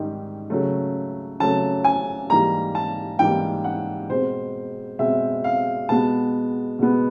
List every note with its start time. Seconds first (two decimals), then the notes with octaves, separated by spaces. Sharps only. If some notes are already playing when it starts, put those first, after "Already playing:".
Already playing: G#2 D#3 G3
0.50 C#3 F#3 A3
1.40 C#3 F#3 A3 A5
1.84 G#5
2.30 G#2 E3 G3 A#3 A#5
2.75 A5
3.19 G#2 E3 G3 A#3 G5
3.64 F#5
4.09 B2 G#3 C4 C5
4.99 B2 G#3 C4 E5
5.44 F5
5.89 B2 G#3 B3 A5
6.79 B2 G#3 B3